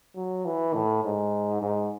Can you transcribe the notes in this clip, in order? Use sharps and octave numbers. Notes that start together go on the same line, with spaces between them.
F#3
E3
A2
G#2
G#2